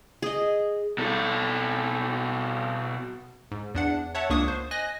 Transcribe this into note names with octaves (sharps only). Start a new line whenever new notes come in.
G#4 D#5
B2 A4
G#2
E2 D4 F#5
C#5 E5 F#5 A5
C#2 A#3 D4 C#6 D#6
C5
D#5 G#5 F#6 A#6